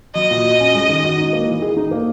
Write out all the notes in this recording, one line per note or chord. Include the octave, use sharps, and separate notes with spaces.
F#3 D#5
A#2
F#4
C#4
G#3
D#3
F#4
D#4
A#3
E3
G#4
D#4
A#3